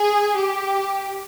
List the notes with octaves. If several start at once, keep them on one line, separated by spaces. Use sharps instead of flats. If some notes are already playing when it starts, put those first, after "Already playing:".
Already playing: G#4
G4